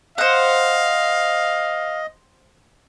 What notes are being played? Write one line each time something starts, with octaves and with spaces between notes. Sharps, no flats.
C5 D#5 F5 F#5